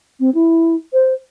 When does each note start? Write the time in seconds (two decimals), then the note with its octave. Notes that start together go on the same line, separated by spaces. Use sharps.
0.20 C4
0.34 E4
0.93 C5